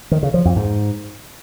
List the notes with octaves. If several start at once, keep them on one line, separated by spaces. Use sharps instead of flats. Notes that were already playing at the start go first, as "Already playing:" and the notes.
D#3
C#3
F3
F2
G#2